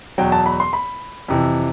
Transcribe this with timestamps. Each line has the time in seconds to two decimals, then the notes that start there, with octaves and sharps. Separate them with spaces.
0.18 E2 B2 F#3 G5
0.32 A5
0.46 B5
0.60 C6
0.73 B5
1.28 F2 C3 E3